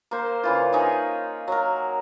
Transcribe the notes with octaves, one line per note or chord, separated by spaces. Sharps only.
A#3 C5
C#3 E3 F4
D#4 G#4 C#5
F#3 A#4